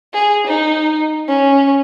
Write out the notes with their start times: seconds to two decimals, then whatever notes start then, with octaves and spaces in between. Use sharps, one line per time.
0.14 G#4
0.47 D#4
1.28 C#4